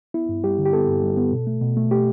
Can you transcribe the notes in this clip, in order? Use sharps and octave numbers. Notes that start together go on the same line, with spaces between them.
B3 E4
G2
G3 G4
D3
G4
B3 A4
G2
G3
B3
B2
A3
B2
A3
A3 G4